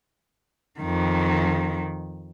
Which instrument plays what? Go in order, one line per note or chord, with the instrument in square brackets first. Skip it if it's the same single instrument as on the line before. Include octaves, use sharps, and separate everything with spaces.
[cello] F2 D#3